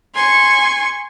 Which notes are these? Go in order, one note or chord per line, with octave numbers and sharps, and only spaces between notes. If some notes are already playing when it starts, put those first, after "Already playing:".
G#5 C6 C#6